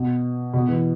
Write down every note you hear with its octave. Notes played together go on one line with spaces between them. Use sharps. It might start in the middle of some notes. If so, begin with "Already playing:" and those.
Already playing: B2
B2
E3